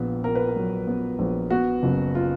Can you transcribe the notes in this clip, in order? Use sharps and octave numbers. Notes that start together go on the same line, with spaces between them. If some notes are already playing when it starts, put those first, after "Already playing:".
Already playing: A#1 A#2 B3
B3 A#4
B4
A#4
F#3
B3
A#1
B3 F#4
F#1
F4